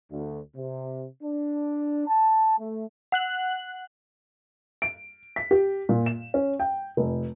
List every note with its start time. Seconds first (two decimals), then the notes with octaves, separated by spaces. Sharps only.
0.10 D2
0.56 C3
1.22 D4
2.07 A5
2.59 A3
3.12 F#5 F#6 F#7
4.82 D7
5.36 B6
5.51 G4
5.89 A#2
6.06 E7
6.34 C#4
6.60 G5
6.97 F1